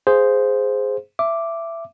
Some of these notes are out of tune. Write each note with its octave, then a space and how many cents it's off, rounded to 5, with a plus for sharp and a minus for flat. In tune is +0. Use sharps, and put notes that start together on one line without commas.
G#4 +0 C5 -5 F5 +0
E5 +15 D6 +0